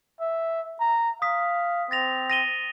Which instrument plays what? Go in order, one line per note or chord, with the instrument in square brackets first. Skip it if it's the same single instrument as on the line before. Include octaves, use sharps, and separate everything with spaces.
[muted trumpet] E5
A#5
[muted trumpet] F5 [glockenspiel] D#6 B6
[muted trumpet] C4 [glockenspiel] A6 A#6 F7
[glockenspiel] A#6 D#7 G7